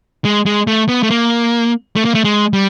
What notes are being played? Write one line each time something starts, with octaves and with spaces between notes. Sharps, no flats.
G#3
G#3
A3
B3
A3
A#3
A3
A#3
A3
G#3
G3